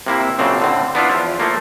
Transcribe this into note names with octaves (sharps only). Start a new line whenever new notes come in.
C3 A#3 E4
F#2 A#2 C#3 C4 D4
A2 D3 C4
B3 D4 E4 F4
E2 F3
F3 A3 A#3